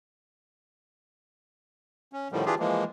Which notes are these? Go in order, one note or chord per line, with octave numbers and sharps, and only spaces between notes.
C#4
A2 D3 D#3 F3 G3
E3 D4 F4 G4 G#4
E3 F3 G#3 A#3